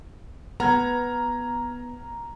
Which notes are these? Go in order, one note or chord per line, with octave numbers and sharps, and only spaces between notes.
B3 A#5 F6 G#6